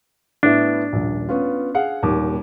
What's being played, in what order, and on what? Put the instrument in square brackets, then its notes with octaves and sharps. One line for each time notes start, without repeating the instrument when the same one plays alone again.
[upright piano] A2 B3 E4 [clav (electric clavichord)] D4
[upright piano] D#1 A#1
B3 C#4 F4
G#4 F5 F#5
D#1 D#2 D6